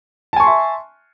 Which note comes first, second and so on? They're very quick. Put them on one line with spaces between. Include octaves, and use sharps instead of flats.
A5 G#5 C#6 C6 E5